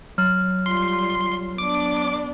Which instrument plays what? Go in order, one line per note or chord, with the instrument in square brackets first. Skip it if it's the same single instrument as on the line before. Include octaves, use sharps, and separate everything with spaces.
[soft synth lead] F#3 [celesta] F6
[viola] G3 F4 [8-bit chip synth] C6
[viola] B3 D4 [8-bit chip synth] D6